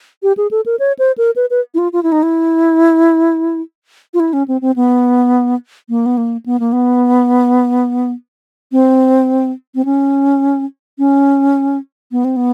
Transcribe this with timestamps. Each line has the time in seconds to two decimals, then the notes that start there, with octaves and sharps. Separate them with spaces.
0.23 G4
0.37 G#4
0.51 A4
0.66 A#4
0.79 C#5
0.99 C5
1.18 A#4
1.36 B4
1.50 B4
1.74 E4
1.78 F4
1.93 F4
2.03 E4
2.12 D#4
2.23 E4
4.14 F4
4.20 E4
4.33 C#4
4.48 C4
4.61 C4
4.76 B3
5.89 A#3
6.06 B3
6.17 A#3
6.46 B3
6.60 A#3
6.72 B3
8.72 C4
9.75 C4
9.85 C#4
10.98 C#4
12.12 B3
12.24 C4
12.36 B3